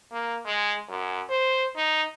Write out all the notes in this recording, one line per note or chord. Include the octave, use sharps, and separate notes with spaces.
A#3
G#3
F#2
C5
D#4